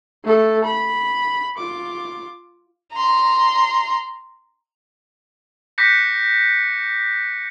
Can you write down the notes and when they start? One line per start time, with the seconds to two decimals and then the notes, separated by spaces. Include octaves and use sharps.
0.24 A3 A4
0.64 B5
1.58 F4 D6
2.93 A#5 C6
5.78 D6 F#6 G6 A#6 B6 C#7